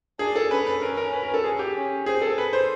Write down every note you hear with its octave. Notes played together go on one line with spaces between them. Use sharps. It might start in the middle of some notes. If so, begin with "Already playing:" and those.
D4 G#4
A4
C#4 B4
B4
C#4 A#4
A#4
B4
A#4
A4
G#4
G4
C#4
C4 G#4
A4
B4
C5